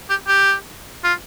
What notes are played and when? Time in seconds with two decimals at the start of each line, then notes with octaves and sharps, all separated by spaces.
0.10 G4
0.27 G4
1.04 F4